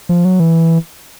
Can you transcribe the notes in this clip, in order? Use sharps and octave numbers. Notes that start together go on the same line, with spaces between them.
F3
F#3
E3